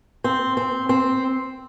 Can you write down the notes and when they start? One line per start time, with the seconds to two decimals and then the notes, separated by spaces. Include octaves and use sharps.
0.24 C4
0.57 C4
0.89 C4